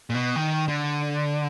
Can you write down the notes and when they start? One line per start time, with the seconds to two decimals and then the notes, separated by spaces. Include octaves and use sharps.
0.10 A#2
0.14 B2
0.36 D#3
0.68 D3